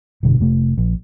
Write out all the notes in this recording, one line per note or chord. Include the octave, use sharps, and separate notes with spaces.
F1 G2 B2 D3
F1 C3 A3
A#1